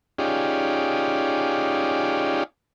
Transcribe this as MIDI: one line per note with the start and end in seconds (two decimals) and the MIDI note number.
0.19 2.43 61
0.19 2.43 63
0.19 2.43 65
0.19 2.43 67
0.19 2.43 68
0.19 2.43 74